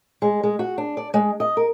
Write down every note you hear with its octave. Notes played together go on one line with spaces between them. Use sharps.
G#3
G#3
F#4
D4
D5
G#3
D#5
A#4